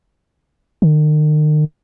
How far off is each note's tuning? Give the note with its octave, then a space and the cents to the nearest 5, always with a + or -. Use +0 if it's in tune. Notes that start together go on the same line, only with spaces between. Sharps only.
D#3 -40